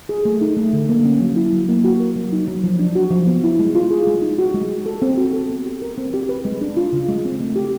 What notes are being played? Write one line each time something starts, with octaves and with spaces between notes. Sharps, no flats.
G#4
A3
D#4
A3
D3
A#3
C#4
F#3
E4
F#3
A#3
F#4
A#4
F#3
D#4
F#3
F3
D4
F#4
F3
B3
E4
G#3
F4
G#4
G#3
D#4
F#4
G#3
F#4
A4
C4
F#4
A4
B3
G4
A#4
C4
G4
B4
G#3
D4
F4
C#3
G#3
C4
A3
G4